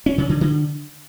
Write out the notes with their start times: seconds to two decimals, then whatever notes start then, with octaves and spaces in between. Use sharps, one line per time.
0.06 C#4
0.18 C#3
0.29 D3
0.41 D3